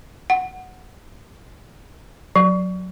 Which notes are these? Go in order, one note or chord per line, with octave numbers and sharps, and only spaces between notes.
F#5
F#3